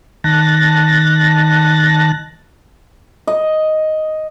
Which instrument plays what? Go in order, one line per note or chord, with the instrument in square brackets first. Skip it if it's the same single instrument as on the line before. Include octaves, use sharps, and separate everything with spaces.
[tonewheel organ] D#3 A5 F#6 A6 A#6
[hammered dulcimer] D#5